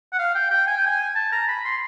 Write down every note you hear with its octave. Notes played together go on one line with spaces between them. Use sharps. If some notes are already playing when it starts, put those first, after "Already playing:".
F#5
F5
G5
G5
G#5
G5
G#5
A5
A#5
B5
C6